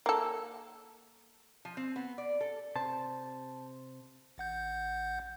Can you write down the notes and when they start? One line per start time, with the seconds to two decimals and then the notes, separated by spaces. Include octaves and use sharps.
0.06 A#3 A4
1.65 F3
1.77 C4
1.96 B3
2.18 D5
2.41 A4
2.76 C3 C5 A5
4.38 A1 F#5 G6